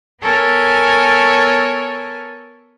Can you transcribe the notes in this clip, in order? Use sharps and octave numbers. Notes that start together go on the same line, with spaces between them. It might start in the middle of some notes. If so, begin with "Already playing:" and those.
B3 A4 A#4 C#5 G#5